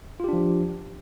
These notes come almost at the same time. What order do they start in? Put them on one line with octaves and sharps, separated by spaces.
F4 G4 D4 F3